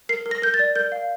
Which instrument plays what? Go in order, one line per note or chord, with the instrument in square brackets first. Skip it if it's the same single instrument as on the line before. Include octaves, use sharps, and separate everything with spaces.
[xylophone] A#4 C7
A#4
A#6
A#4 G6
A6
D5
A#4 G6
F5